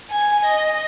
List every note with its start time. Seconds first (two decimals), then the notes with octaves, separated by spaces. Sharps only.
0.11 G#5
0.45 D#5